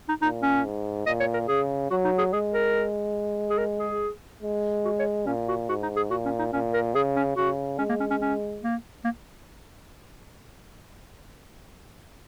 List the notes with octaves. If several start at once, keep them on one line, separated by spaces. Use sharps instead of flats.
D#4
A#2 D#4
C#4
G#2
A#2 D#5
C#5
A#4
C#3 G#4
F#3 F#4
D#4
G#4
G#3 G#4
A#4
G#4
A#4
G#4
G#3
F#4
C#5
A#2 C#4
F#4
G#2 F#4
D#4
G#4
A#2 F#4
C#4
D#4
A#2 C#4
A#4
C#3 G#4
C#4
C#3 F#4
G#3 C#4
A#3
C#4
C#4
C#4
A#3
A#3